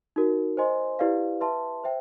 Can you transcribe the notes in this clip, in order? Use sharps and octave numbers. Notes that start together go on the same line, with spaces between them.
D#4 F#4 A#4
C5 D#5 G#5 C6
E4 G4 B4 D5 F5
B4 E5 A5 C6
C5 E5 G5